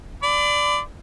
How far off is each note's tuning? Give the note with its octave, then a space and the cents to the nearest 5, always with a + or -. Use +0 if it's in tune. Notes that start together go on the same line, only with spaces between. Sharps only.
D5 +0 B5 +40